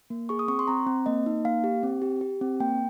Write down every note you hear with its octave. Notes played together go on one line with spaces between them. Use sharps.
A#3
G#4 C#6
D#6
C4 C#6
C6
C4 A#5
C4
A#3 D#5
D#4
A#3 F5
G4
C4
G4
G4
C4
A#3 G5